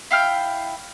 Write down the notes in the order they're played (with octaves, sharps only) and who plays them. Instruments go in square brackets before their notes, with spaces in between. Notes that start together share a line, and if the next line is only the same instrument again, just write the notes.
[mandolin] E4 F5 G5 F6